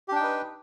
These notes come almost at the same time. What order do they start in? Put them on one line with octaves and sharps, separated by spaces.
G4 D4 G5 D#4 B4